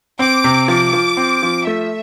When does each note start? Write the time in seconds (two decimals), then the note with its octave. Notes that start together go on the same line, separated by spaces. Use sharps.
0.19 C4 D6
0.44 C3
0.68 F3 D6
0.93 F3
1.17 C4
1.43 F3
1.67 A3 E5